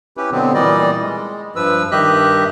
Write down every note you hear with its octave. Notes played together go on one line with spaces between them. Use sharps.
C#4 E4 G4 B4
B2 D3 F#3 B3 C4
A#2 E3 G3 D5 D#5
G#3
G2 F3 B4 E6
G2 D#3 G4 D#5 E5 F#6